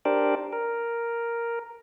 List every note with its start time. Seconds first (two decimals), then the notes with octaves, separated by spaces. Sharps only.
0.05 D4 G4 A#4 C5 D5
0.53 A#4